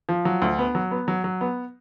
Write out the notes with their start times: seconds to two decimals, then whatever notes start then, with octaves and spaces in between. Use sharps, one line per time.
0.09 F3
0.25 F#3
0.42 D2
0.59 B3
0.75 F#3
0.91 B3
1.08 F#3
1.24 F#3
1.41 B3